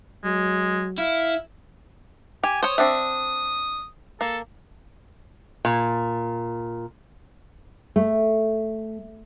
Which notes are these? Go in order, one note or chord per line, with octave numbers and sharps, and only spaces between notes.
F#3 G#3
E4 F5
G4 G#5
C5 C#5 D#6
C4 D4 E5
A#3 A4
A#2
A3